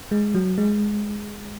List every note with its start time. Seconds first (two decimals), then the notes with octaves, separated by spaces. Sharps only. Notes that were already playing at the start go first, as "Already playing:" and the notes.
0.11 G#3
0.35 F#3
0.58 G#3